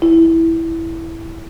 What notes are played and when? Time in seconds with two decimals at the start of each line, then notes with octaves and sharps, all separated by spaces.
0.02 E4